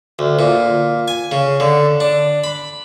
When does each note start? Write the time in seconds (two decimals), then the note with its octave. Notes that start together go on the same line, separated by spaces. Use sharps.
0.19 D2
0.39 A#2
1.08 G#5
1.32 C#3
1.60 D3
2.00 D4
2.44 B5